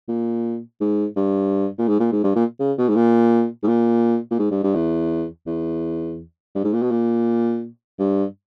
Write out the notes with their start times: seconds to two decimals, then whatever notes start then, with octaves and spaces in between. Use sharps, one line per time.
0.08 A#2
0.80 G#2
1.16 G2
1.78 A#2
1.88 G#2
2.00 A#2
2.12 G#2
2.24 G2
2.36 A#2
2.60 C#3
2.78 B2
2.89 G#2
2.96 A#2
3.63 G#2
3.68 A#2
4.31 A#2
4.39 G#2
4.51 G2
4.64 G2
4.75 E2
5.47 E2
6.55 G2
6.64 G#2
6.73 A#2
6.82 B2
6.91 A#2
7.99 G2